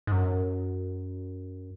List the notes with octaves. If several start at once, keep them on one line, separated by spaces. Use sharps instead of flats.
G#2
F#2